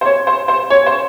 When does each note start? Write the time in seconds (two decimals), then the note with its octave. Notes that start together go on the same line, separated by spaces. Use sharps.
0.01 C5
0.05 C#5
0.27 C5
0.48 C5
0.70 C#5
0.86 C5